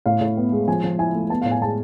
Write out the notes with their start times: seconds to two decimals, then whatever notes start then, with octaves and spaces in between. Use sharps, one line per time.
0.06 A2 F5
0.21 A2
0.37 B3
0.52 G#3
0.68 F3 G#5
0.84 F3
0.99 E4 G#5
1.15 A3
1.30 B3 A5
1.42 A2 F5
1.51 G#5
1.62 G#3 A5